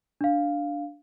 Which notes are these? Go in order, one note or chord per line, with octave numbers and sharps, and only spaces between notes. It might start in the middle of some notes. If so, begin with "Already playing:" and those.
D4 F5